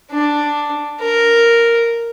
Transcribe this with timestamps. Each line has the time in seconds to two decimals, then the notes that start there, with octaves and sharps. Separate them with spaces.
0.11 D4
1.01 A#4